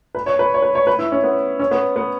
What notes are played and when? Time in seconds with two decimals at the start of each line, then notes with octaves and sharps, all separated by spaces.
0.15 B4
0.26 C#5
0.39 B4
0.54 C#5
0.62 B4
0.75 C#5
0.87 B4
0.99 E4
1.12 C#4
1.24 B3
1.59 C#4
1.71 B3
1.96 B3